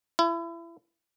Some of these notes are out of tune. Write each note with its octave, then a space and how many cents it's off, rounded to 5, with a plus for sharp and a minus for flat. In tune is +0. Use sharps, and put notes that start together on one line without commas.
E4 +30